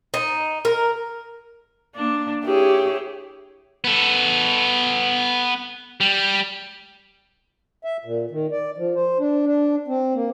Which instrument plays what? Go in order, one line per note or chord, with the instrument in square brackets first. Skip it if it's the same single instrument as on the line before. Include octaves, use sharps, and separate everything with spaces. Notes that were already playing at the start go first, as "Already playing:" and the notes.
[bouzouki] D#4
A#4
[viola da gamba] A#3 D4
[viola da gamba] E4 G#4 [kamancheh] G4 C#5
[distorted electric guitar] B3 A4
G3
[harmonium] E5
A#2
D#3
D5
F3
C5
D4
D4
C4
A#3